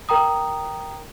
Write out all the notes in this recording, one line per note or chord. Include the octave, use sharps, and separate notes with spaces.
A#4 G5 A#5 D#6